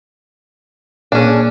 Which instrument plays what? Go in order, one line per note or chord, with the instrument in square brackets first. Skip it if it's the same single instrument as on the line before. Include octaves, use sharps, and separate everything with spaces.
[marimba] A#2 A#3 G#4 [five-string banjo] C#4 D4